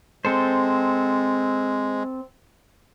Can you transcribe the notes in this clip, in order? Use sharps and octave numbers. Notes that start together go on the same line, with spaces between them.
G#3 C4 A4 C5